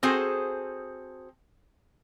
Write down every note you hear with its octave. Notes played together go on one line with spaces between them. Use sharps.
C4 F#4 G#4 A4 C5 G#5